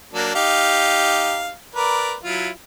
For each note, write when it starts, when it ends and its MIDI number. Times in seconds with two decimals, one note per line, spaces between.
0.13 0.34 54
0.13 0.34 58
0.13 0.34 62
0.35 1.53 63
0.35 1.53 67
0.35 1.53 77
1.75 2.15 70
1.75 2.15 71
1.75 2.15 74
2.24 2.49 54
2.24 2.49 64
2.24 2.49 65